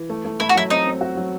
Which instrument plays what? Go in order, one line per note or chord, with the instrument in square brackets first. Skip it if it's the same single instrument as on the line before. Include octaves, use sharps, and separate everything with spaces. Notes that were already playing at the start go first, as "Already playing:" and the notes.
Already playing: [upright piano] E3
A3
A3
[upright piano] A3 [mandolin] E4
[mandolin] F#4
[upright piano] F#3 [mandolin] E4
[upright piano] C4 [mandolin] D#4
[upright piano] C4
F#4
F#3